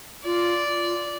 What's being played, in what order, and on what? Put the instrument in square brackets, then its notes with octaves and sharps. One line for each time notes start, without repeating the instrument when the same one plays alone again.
[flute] F4 [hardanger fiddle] D5
[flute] F4